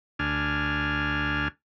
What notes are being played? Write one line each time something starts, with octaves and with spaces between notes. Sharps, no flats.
D2 D4 G#5 F6